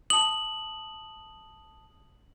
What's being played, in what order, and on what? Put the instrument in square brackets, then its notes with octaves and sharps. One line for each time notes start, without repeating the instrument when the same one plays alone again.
[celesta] A5 D#6 [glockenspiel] F#7